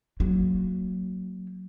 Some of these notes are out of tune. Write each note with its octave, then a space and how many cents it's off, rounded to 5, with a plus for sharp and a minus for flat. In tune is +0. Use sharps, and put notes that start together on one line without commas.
F#3 +0 A#3 -25